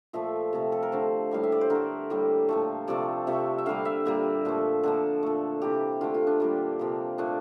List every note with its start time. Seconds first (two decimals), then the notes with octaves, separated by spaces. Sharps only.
0.13 A#2 F3 A3 E5
0.53 C3 F3 A3
0.72 A4
0.83 A#4
0.92 D3 A3 C5
1.31 A2 G3 A#3 F5
1.43 E5
1.52 D5
1.61 C5
1.70 D3 A3 A#4
2.10 A2 G3 A#3
2.49 A#2 F3 A3
2.88 C3 F3 A3 D5
3.27 C3 F3 A3 E5
3.58 E5
3.66 D3 G3 A#3 F5
3.85 E5
4.05 A#2 G3 A#3
4.45 A#2 F3 A3
4.83 D3 F3 A#3 A4
5.23 A#2 A3
5.62 C3 E3 A#3 G4
6.01 D3 A3 F4
6.14 F4
6.27 D4
6.40 A#2 G3 A#3
6.79 C3 F3 A#3
7.18 A#2 A3 D4